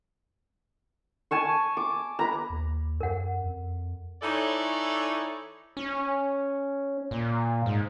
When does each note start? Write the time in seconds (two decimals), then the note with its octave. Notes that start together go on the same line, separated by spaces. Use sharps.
1.31 G#5 A5 C#6
1.77 D6
2.19 B4 A#5
2.50 D#2
3.01 F#2 A#4 F#5
3.44 F2
4.23 E3 D#4 E4 A4 C#5 D5
5.77 C#4
7.11 A#2
7.66 G#2